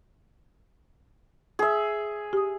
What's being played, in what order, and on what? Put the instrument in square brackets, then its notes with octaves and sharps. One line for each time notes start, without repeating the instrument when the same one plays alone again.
[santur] G#4 E5
[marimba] G4 D#6